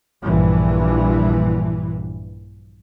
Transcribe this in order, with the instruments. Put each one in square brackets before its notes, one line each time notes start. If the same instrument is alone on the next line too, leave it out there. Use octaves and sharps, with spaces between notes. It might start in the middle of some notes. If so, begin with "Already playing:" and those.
[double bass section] A#1 G2 E3